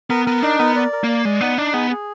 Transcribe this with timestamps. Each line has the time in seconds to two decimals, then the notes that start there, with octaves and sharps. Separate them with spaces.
0.10 B3 A#4
0.26 B3 A#4
0.42 D4 D#4
0.59 B3 A#4
0.76 D5
0.93 A#4
1.04 A#3 D5
1.25 G#3 D5
1.41 B3 D#4
1.58 D4 D#4
1.73 B3 G#4
1.91 G#4